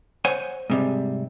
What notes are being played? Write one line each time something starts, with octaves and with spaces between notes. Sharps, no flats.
C5 C#5 F#5 G#5
G#2 C3 G3